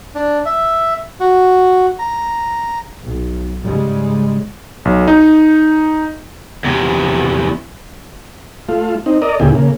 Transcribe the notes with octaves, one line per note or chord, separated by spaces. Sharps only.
D4
E5
F#4
A#5
B1
G#2 C#3 G3 G#3
B1
D#4
E2 C3
A3 F4
C4 D#4
A#4 D5 D#5
D2 A#2 C#3 E4 G4 G#4
C#3 A#3